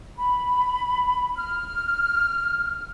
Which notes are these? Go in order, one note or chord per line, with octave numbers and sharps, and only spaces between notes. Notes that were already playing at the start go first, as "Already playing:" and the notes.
B5
F6